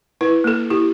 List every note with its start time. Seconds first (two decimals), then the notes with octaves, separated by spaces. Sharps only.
0.21 E4 B4
0.44 A#3 A4
0.70 E4 G4